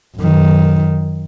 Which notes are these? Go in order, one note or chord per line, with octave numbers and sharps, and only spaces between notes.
F#2 D#3